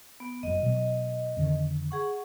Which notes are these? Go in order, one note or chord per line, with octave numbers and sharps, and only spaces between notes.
B3
F#1 F#2 D#5
B2 F#3
F2 D3 D#3
G#4 F#5 C#6